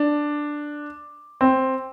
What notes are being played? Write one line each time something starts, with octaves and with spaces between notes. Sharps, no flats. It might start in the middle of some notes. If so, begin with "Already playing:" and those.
Already playing: D4
C4